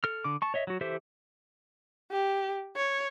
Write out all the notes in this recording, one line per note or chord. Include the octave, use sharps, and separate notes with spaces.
A4 F6
D3 D6
A5 C#6
C#5 D#5 E5
F#3 F#4
E3 G4 A4 C5 E5
G4
C#5